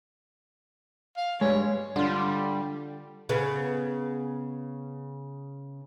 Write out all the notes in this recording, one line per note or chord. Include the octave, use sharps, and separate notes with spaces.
F5
G2 G3 G#3 C#5
D3 G3 F4
C#3 B3